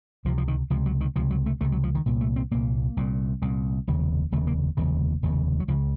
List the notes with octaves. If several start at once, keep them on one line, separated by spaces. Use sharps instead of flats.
C#2 C3 F3
F3
D#3
C#2 C3 F3
F#3
D#3
C#2 C3 F3
F#3
A3
C#2 C3 A3
F#3
F3
D#3
C2 A#2
A3
C4
C2 A#2 A#3
C2 A#2
C2 A#2
F1 D#2 C#3
F1 D#2 C#3 A3
A#3
F1 D#2 C#3
F1 D#2 C#3
F#3
C#2 C#3 F3